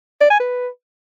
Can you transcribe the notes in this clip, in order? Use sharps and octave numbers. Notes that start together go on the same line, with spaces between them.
D5
G#5
B4